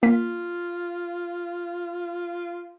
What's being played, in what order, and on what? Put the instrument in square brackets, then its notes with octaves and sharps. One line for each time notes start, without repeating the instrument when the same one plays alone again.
[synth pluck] A#3 B6 [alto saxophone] F4